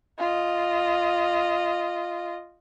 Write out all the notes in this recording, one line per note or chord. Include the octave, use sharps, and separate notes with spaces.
F4 D#5